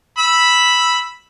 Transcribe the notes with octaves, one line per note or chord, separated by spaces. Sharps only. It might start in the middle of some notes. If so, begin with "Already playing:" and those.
B5 E6